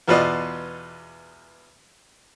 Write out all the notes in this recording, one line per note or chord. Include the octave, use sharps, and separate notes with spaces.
E2 B2 F4 B4 D5 D#5